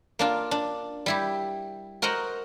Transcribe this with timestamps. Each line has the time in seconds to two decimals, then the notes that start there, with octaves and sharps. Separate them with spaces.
0.19 A#3 D4 F4
0.51 D4
1.06 G3 E4 G4
2.02 F#4 A#4 C5 D#5 F#5